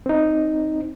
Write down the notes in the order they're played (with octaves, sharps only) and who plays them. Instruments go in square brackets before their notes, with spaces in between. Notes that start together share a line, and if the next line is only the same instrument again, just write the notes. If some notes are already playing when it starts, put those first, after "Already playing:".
[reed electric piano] C4 D#4